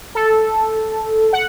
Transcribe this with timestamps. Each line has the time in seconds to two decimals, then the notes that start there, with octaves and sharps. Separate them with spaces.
0.15 A4
1.33 F#5